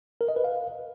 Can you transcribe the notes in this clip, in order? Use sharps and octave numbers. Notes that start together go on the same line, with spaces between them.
A#4
D#5
B4
F5